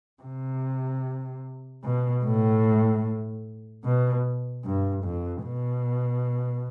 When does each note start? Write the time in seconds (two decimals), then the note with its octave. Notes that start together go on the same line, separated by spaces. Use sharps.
0.23 C3
1.84 B2
2.24 A2
3.84 B2
4.65 G2
5.04 F2
5.44 B2